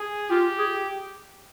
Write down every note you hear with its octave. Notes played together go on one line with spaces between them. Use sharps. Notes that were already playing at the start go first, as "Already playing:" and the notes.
Already playing: G#4
F4 G4
G#4